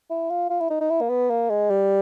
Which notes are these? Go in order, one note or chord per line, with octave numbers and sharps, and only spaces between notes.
E4
F4
F4
E4
D#4
D#4
E4
A#3
B3
A#3
G#3
G3